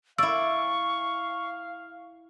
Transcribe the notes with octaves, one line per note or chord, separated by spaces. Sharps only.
E4 D5 F5 C#6 E6